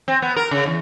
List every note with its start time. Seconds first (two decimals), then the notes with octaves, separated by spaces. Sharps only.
0.08 C4
0.22 B3
0.36 A#4
0.51 C#3
0.66 E2